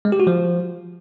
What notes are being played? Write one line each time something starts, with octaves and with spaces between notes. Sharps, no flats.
G#3
G4
F#4
F3